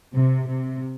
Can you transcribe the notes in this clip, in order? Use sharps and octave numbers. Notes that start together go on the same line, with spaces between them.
C3
C3